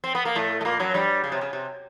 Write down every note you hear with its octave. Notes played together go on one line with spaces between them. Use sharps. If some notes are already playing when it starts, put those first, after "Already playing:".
C4
B3
A#3
A2 A3
A3
A#2 A#3
F#2 F#3
G2 G3
C#3
C3
C#3
C3